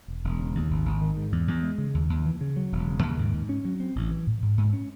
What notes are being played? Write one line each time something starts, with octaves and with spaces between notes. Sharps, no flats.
E1
E1
C#3
D#2
G#1
G#1
D#3
G#2
E2
E2
G#3
C#3
D#2
D#2
E3
C#3
F#3
E1
C#3
D#2
G#2
G#2
C#4
F#3
C4
A1
E3
A2
G#2
G#2
C#4